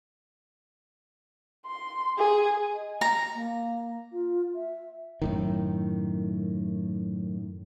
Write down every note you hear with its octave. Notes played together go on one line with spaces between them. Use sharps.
C6
G#4
D#5
A#5
A#3
F4
E5
F#2 A2 D#3